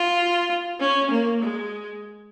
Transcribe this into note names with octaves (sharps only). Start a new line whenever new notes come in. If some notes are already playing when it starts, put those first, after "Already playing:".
Already playing: F4
C#4
A#3
G#3